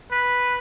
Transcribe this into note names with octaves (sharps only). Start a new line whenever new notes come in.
B4